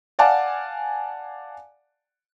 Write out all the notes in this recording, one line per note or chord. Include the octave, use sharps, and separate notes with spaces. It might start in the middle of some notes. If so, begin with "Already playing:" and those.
D5 F5 F#5 G#5 A5 D6